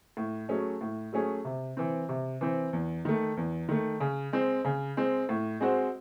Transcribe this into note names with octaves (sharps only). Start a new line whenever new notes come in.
A2
F#3 A3 C#4 G#4
A2
F#3 A3 C#4 G#4
C3
E3 C4
C3
E3 C4
E2
D#3 A3
E2
D#3 A3
C#3
G#3 C4
C#3
G#3 C4
A2
G#3 C4 F#4 C5